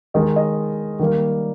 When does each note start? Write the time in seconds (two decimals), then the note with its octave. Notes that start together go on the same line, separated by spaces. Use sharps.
0.14 D#3 G#3 D#5
0.36 D#5
0.99 D#3 G3 A#3